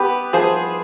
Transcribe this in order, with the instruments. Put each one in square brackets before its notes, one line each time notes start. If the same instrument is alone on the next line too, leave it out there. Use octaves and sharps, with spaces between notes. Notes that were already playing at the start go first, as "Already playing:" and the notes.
Already playing: [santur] B3 [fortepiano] G4 B4
[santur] F3 [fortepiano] G#4 C5